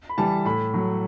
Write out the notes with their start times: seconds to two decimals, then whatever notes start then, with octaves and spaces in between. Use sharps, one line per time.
0.09 B5
0.18 E3 G3 A5
0.45 A2 B5
0.74 F#3 A3